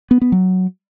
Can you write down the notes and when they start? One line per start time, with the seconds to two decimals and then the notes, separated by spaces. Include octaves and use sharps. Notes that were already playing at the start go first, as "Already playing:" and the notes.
0.11 B3
0.21 B3
0.32 F#3